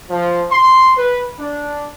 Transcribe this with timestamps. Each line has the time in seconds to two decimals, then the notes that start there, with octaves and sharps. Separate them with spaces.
0.10 F3
0.51 C6
0.97 B4
1.39 D4